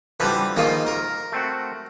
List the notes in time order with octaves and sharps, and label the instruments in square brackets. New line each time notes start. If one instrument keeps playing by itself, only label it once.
[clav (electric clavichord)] D3 E3 F3 [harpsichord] G3 B4
[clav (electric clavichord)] G#2 F4 [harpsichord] D#3 A#3
[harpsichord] A#4
[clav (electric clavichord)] A3 C4 F#4